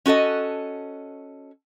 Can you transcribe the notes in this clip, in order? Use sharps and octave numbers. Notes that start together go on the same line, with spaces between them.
C#4 F#4 A4 D#5